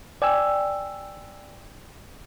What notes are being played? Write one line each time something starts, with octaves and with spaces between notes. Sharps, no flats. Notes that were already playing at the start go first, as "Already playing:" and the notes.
D5 G5 G#5 E6